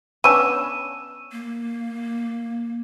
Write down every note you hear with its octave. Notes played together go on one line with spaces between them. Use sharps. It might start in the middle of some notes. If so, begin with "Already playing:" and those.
B3 C#4 D4 E6 D#7
A#3